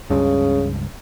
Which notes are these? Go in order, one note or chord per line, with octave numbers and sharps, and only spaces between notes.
C#2 G2 C#3